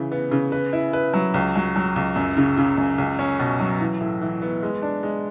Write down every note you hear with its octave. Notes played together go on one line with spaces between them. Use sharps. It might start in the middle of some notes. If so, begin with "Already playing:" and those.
Already playing: C#3 E3
B3
C#3
B4
E4
B4
F#3
C#2
F#3
F#3
C#2
F#2
C#3
C#3
F#2
C#2
C#4
B2
F#3
E3
A2
E3
B3
G#3
D4
G#3